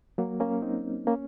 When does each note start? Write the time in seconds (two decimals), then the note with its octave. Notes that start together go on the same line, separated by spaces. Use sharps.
0.18 F#3 A#3
0.40 A#3 C#4
0.62 C4 D#4
1.07 A#3 C#4